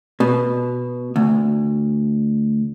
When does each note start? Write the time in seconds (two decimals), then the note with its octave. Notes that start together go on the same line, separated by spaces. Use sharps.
0.20 B2
1.16 D2